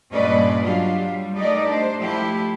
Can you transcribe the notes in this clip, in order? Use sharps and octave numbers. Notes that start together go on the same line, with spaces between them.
G2 A#2 C#4 B4 D5 D#5
F#3 D4 F4 G4
G3
A3 D#4 G4 A#4 D5 D#5
D4 C5
F3 A3 E4 G4